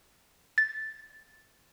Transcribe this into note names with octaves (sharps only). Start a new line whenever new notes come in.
A6